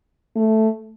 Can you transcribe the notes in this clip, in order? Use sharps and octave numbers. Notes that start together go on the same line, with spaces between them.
A3